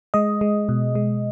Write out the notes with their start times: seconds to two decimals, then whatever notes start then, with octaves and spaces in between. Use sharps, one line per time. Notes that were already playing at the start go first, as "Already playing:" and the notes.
0.14 G#3 D#5
0.41 G#3
0.69 B2
0.95 G#3